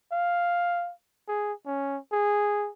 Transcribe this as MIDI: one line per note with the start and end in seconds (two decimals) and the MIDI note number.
0.12 0.92 77
1.28 1.53 68
1.66 1.98 61
2.12 2.70 68